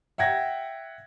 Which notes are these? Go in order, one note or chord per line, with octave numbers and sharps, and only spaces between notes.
E5 F#5 G5 G#6 A#6